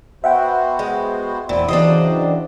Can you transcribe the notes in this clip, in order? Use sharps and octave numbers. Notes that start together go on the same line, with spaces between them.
B3 F#4 C5 E5 F#5 G5
G#3
E1 A#2 C4 E4
C#3 E3 F#3 D4 G4 C5 D#5